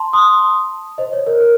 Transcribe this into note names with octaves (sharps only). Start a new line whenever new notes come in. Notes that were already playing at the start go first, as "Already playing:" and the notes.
Already playing: A5 C6
C6 D#6
C5 D#5
C#5
A#4
A#4